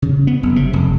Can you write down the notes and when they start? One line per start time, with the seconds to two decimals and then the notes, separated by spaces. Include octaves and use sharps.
0.02 C#3
0.27 B3
0.43 F#1
0.56 C3
0.73 F1